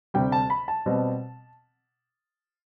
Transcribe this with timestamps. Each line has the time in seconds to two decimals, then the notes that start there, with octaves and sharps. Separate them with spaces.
0.14 D2 C3 G3 G5
0.32 A5
0.50 B5
0.68 A5
0.86 B2 G3 C4